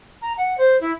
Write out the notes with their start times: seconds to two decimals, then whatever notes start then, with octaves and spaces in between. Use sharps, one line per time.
0.22 A#5
0.37 F#5
0.58 C5
0.81 E4